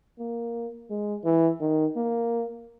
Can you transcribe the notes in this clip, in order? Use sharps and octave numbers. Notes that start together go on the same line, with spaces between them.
A#3
G#3
E3
D#3
A#3